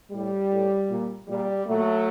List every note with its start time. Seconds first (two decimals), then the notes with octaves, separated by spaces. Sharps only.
0.12 A2 G3
0.51 A2
0.89 A#2
1.28 A#2 G3
1.66 A#2 F#3 A3